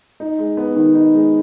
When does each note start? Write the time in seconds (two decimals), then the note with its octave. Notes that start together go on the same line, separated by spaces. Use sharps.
0.20 D#4
0.39 G#3
0.57 B3
0.76 D#3
0.94 D#4
1.14 G#3